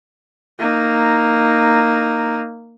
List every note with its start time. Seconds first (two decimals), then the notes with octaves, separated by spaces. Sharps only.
0.59 A#3 D#4